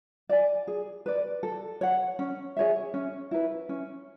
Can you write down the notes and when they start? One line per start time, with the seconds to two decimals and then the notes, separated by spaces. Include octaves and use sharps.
0.29 D5 G#5
0.67 G#4
1.06 B4 D5
1.43 A4
1.81 C#5 F#5
2.19 C#4
2.57 G#4 C#5 E5
2.94 C#4
3.31 E4 B4
3.69 C#4